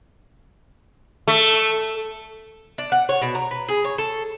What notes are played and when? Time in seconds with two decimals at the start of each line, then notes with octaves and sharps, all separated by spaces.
1.28 A3
2.78 D4
2.92 F#5
3.09 C#5
3.22 B2
3.35 A#5
3.51 B4
3.69 G#4
3.84 C#5
3.98 A4